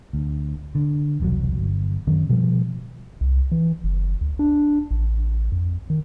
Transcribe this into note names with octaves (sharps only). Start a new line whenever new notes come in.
D2
D3
E1 C2 D3 F#3
G1
F#2 D#3 F#3 C#4
B2 F3 G3
C2
E3
F#1
D2
D4
A1
F2
D#3